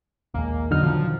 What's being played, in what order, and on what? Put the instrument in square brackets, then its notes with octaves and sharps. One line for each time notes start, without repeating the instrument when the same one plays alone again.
[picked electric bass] A#1 D#2 G#3 [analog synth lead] A#3
[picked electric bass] E2 B3 [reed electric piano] D3 F#3 F6 [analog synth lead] D#4
[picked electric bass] B2 D#3 [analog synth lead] F3